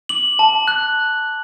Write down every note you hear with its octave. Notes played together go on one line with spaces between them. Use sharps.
D6 F#7
A5
F#6